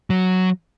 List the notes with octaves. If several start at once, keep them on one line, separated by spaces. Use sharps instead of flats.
F#3